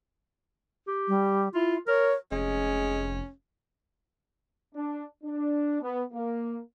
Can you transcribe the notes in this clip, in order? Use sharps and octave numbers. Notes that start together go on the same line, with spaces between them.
G4
G3
E4 F4
A#4 C#5
F1 G#3 C#4
D4
D4
B3
A#3